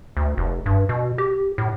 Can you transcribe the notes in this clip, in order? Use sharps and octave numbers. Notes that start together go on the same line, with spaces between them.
D2
F1
G2
B2
G4
A2